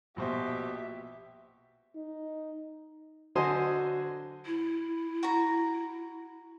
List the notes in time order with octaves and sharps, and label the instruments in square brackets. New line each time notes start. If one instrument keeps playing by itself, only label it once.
[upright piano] A#1 B2 C5 [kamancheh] G4 E5
[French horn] D#4
[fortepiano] D3 F#3 F#4 C5 D#5 G#5
[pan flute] E4
[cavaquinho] F#4 A#5